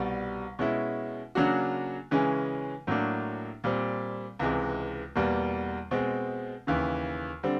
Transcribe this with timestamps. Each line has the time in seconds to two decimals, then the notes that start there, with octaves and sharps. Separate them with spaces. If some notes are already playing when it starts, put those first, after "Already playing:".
Already playing: C2 B2 G3
0.59 B2 G#3 C#4 E4
1.35 C#3 F#3 A#3 D4 F#4
2.11 C#3 E3 G#3 C#4
2.87 A2 F#3 A#3 D4
3.64 A#2 G3 C4
4.39 C#2 C3 E3 G#3
5.15 E2 B2 G3 A#3
5.91 B2 G#3 C4
6.67 D#2 C#3 E3
7.43 D3 G3 C4